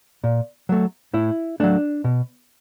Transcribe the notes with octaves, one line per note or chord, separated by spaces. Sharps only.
A#2
F#3 A3
A2 E4
F#3 A3 D4
B2